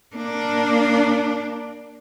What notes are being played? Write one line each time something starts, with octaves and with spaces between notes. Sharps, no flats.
A#3 D4